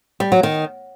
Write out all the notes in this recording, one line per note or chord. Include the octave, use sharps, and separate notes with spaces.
G3
F#3
D#3